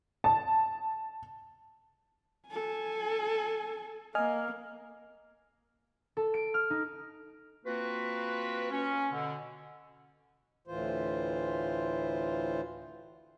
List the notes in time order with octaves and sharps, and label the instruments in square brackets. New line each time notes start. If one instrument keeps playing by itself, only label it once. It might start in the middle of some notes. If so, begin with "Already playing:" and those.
[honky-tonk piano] A5
[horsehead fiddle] A4 G#5
[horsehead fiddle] A#3 [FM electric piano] D#5 G#5 F6
[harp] A4
D7
F6
D#4
[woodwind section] A#3 C4 F4 F#4 B4
C#4
B2 D3
[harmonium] D2 A2 E3 F4 C5